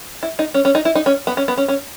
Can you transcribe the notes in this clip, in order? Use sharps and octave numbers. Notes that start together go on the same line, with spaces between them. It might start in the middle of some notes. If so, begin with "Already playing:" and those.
E4
D#4
C#4
C#4
D#4
E4
D#4
C#4
B3
C#4
B3
C#4
C#4